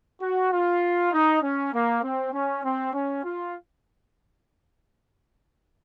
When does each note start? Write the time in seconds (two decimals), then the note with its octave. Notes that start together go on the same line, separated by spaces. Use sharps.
0.21 F#4
0.52 F4
1.13 D#4
1.42 C#4
1.73 A#3
2.03 C4
2.33 C#4
2.64 C4
2.93 C#4
3.24 F4